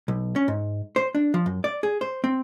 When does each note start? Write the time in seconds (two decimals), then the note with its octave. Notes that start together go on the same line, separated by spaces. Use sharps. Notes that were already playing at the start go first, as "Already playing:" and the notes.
0.08 B1
0.36 C#4
0.48 G#2
0.96 C5
1.15 D4
1.34 F3
1.46 F#2
1.64 D5
1.83 G#4
2.01 C5
2.24 C4